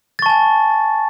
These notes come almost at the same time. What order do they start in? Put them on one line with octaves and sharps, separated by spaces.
A6 C#6 A5 G#5